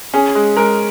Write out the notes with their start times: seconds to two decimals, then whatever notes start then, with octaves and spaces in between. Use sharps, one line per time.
0.14 C#4 G#4
0.35 G#3
0.57 G#3 A#4